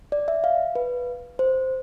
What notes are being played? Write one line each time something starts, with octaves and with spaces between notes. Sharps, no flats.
D5
E5
F5
B4
C5